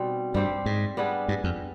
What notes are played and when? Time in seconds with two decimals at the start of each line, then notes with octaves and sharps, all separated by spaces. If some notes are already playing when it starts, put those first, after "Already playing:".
Already playing: B2 G3 C4 D#4
0.34 G2 G3 C4 G4 C5
0.66 G#2
0.97 G3 B3 D4 G#4
1.28 G2
1.44 F2